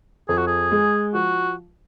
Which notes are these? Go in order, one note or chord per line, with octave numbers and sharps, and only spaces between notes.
F2 G#4
F#4
G#4
G#3
F3 F#4